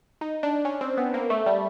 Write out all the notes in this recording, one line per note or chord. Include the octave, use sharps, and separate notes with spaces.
D#4
D4
C#4
C4
B3
A#3
A3
G3